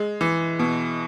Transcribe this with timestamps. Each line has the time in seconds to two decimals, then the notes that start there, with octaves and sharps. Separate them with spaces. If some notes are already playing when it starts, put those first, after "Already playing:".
Already playing: G#3
0.21 E3
0.59 B2